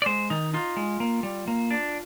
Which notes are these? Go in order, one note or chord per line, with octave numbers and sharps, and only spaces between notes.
D5
G#3 C5
D#3 D#4
D#4 F4
G#3
A#3
G3
A#3
D4